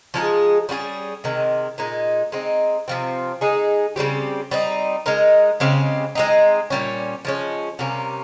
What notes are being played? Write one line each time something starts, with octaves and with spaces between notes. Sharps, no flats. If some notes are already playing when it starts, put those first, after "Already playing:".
F3 G#3 D#4 G#4
G3 C#4 F4 G#4
C3 D#3 G#3
A#2 G#3 D#4
G#3 C4 D#4
C3 F3 C4
G#3 D#4 G#4
C#3 G3 C4 G4
G3 C4 D#4
G#3 D#4 A#4
C#3 G#3 C4 G4
G#3 C4 D#4
A#2 G3 C#4
F3 G#3 C#4
C3 G3 A#3 C#4